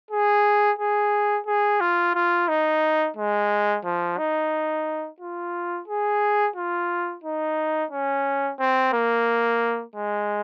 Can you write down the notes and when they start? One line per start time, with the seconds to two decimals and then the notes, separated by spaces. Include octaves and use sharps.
0.11 G#4
0.79 G#4
1.47 G#4
1.80 F4
2.15 F4
2.48 D#4
3.16 G#3
3.85 F3
4.18 D#4
5.20 F4
5.88 G#4
6.56 F4
7.24 D#4
7.91 C#4
8.60 C4
8.93 A#3
9.96 G#3